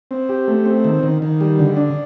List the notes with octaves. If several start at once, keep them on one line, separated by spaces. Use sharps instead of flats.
C4
G4
A3
C4
D#3
D#3
D#3
G3
D3
D4